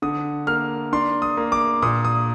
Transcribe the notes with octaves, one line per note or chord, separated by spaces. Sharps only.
D3 D#6
A#3 F6
D4 C6
D#6
A#3
D6
A#2 D#6
D#6